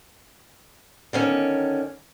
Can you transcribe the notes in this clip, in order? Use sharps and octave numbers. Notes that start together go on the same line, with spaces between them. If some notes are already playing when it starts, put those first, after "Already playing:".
D3 D#3 C#4